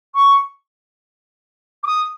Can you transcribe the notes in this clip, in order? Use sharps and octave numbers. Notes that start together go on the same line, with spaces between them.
C#6
D6
D#6